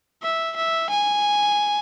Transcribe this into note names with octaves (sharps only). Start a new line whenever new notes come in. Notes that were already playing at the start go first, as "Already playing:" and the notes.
E5
E5
G#5